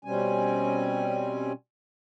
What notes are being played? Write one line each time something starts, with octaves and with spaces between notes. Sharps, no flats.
B2 G3 C4 C#4 G#5